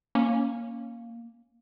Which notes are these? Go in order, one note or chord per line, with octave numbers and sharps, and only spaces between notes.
A#3 C#4